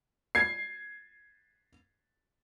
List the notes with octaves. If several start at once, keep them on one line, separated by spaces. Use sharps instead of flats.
G#6 C7